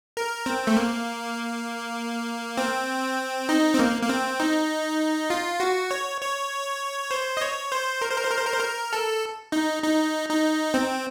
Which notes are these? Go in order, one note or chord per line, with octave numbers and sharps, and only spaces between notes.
A#4
C4
A3
A#3
C4
D#4
C4
A#3
A#3
C4
D#4
F4
F#4
C#5
C#5
C5
D#5
C#5
C5
A#4
C5
A#4
C5
A#4
C5
A#4
C5
A#4
A4
D#4
D#4
D#4
C4